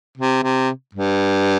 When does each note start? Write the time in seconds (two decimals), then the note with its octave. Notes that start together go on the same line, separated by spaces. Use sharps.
0.18 C3
0.43 C3
0.95 G2